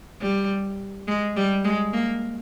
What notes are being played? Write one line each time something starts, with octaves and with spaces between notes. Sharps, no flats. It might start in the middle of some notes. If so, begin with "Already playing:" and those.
G3
G#3
G3
G#3
A#3